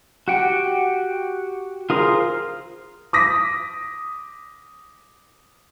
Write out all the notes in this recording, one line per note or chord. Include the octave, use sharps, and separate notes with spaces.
F#4 G4 F#5 G5
F4 G#4 A#4 C5
D6 D#6 A#6 B6